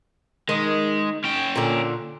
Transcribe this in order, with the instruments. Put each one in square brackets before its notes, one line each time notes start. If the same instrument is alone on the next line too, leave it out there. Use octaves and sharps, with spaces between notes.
[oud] D#3 [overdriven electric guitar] G#3
[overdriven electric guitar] C#4 G5
[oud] A#2 D3